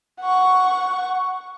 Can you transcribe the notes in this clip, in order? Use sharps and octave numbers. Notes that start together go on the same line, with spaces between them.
F#5 C#6